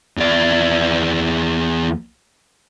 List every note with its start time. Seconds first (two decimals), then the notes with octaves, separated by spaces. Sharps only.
0.17 E2 D5